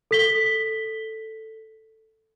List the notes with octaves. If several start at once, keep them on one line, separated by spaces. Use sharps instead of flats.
A4 B6 G7